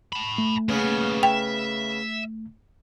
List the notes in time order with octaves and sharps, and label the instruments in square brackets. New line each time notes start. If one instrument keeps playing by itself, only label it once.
[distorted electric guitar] A5 B5
[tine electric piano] A3
[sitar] C#3 B3 [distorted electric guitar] A#3 F#5
[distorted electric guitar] E5 [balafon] G5